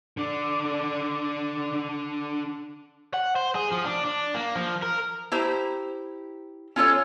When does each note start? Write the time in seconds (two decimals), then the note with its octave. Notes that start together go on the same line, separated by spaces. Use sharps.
0.17 D3 D4
3.14 F#5
3.36 C5
3.55 G#4
3.72 F3
3.85 D4
4.05 D4
4.35 A#3
4.55 F3
4.82 A#4
5.32 E4 G4 C5 A#5
6.76 C#4 F4 A4 C#5